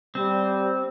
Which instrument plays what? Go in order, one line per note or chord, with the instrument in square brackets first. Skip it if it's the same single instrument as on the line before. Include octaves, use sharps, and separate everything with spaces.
[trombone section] G3 [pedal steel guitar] C4